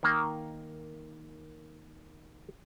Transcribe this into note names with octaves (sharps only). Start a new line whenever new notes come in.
D#3 A#3